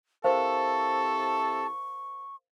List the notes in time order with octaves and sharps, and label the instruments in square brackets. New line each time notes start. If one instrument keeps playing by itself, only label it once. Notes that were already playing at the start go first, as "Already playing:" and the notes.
[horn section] C3 E4 A4 [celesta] A#4 C5 F5 [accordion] A5 [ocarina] C#6